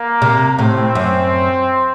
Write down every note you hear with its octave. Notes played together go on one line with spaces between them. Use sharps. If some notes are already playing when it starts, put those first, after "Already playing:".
Already playing: A#3
C3
A2 C4
F#2